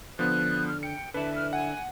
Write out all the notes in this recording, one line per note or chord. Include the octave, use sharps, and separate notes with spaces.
D3 F3 B3 F#6
F6
G5 C#7
D3 E4 B4 A5
F6
F#5 G#5